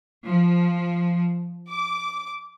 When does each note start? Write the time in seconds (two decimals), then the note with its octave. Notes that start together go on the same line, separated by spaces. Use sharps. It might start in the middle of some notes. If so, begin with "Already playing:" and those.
0.24 F3
1.69 D6